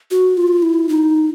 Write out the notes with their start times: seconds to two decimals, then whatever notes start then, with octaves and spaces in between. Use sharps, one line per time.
0.11 F#4
0.37 F4
0.62 E4
0.89 D#4